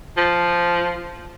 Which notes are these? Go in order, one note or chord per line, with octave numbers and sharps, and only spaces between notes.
F3